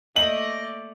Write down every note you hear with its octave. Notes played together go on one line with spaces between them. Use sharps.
A3 A#3 D5 D#5 F#7